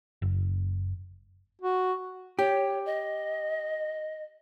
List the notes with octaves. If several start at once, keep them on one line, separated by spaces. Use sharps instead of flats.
F#1
F#4
G4 C#5
D#5